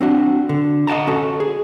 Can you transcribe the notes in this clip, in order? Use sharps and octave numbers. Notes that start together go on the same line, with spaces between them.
C4 D4 F#4
D3
D#5 F#5 G5 A5 A#5
C#4 F#4 A4
G#4